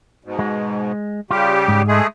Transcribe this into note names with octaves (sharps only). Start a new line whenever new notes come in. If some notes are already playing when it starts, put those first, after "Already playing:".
G#2 B2
G#3
C#3 G3 F4 G4
G#2
G#3 A3 G#4